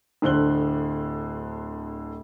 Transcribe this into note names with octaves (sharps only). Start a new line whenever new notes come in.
D1 D3 C5 F#6 G7